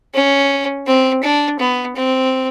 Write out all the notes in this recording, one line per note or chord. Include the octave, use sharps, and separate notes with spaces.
C#4
C4
D4
B3
C4